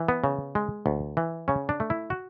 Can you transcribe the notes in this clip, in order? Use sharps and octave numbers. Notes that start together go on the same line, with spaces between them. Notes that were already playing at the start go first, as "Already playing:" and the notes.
Already playing: E3
B3
C#3
G#3
D2
E3
C#3 C#4
D4
A3
E4
F#4